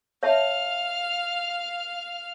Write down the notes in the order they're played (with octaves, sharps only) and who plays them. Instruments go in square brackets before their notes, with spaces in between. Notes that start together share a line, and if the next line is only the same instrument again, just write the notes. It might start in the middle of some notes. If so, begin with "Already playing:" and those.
[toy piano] C#5 E5 A5 [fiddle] F5 F6